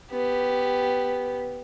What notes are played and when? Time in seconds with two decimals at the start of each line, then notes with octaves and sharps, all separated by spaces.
0.11 B3 G4